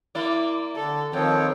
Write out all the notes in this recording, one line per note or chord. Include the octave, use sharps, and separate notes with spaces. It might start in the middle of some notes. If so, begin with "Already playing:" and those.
A#3 E4 D5
D3 A4
F2 D#3 F3 C4 C#5 G5